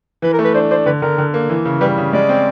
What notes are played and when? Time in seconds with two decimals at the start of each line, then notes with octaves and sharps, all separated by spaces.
0.22 E3 B4
0.33 A#4
0.39 A3
0.44 B4
0.54 D4 C5
0.71 D4 C5
0.86 D3 B4
1.02 D3 A#4
1.18 D3
1.34 A#3
1.49 E3
1.65 C#3
1.81 G3 B4
1.98 C#3
2.13 G#3 D5
2.29 C4